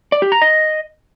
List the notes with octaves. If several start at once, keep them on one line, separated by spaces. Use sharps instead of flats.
D5
G4
A#5
D#5